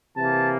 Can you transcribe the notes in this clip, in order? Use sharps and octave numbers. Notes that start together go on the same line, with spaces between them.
C3 E3 A#3 A5